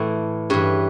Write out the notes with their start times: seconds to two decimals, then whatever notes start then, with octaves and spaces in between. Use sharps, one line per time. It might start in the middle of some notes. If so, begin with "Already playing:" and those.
Already playing: A2 E3
0.50 G2 E3 C#5